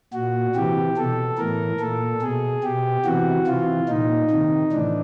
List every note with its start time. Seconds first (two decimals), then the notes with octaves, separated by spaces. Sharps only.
0.13 A#2 F#4
0.55 C3 E3 G4
0.97 B2 A4
1.38 A2 E3 A#4
1.80 A#2 A4
2.22 B2 G#4
2.63 B2 G4
3.05 C3 E3 F#4
3.47 C3 E3 F4
3.89 A#2 D#4
4.31 C3 D#3
4.72 A2 E3 D4